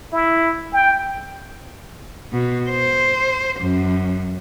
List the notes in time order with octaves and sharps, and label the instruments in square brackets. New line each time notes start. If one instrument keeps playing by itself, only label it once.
[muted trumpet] E4
G5
[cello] B2
C5
F#2